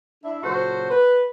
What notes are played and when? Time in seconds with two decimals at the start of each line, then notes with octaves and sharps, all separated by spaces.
0.24 D4 E4 E5
0.43 A#2 C#3 F#3 F#4 A4 C5
0.90 B4